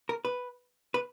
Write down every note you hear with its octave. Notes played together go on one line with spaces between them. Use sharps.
A#4
B4
B4